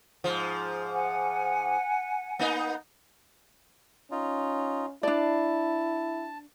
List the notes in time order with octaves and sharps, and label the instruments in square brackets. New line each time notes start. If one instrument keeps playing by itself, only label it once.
[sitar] G#2 F3
[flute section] F#5 G#5
[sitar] A#3 B3 D#4
[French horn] C#4 [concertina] D#4 F4
[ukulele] D4 D5 [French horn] E4 [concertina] A5